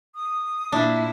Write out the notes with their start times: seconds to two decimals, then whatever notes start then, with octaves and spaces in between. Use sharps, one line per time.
0.15 D#6
0.72 A#2 D4 E4